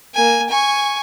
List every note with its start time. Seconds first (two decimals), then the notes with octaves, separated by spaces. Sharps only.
0.15 A#3 G#5
0.49 G#5 C#6